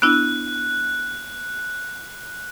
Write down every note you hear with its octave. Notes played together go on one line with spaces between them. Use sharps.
B3 D4 E4 F#6